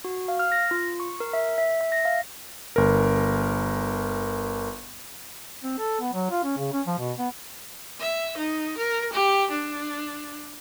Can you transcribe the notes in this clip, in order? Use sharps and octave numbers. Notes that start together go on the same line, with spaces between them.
F#4
F5
F6
A#6
F4
C#6
A#4
E5
E5
E5
A#6
F5
G1 A#4
C4
A4
B3
F#3
F4
C#4
C#3
C#4
F3
B2
B3
E5
D#4
A#4
G4
D4